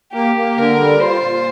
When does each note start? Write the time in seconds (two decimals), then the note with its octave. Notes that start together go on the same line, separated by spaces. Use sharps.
0.13 A#3 G4
0.36 A#3
0.57 D3 A#4
0.79 G3
1.00 F4 C5
1.23 A#2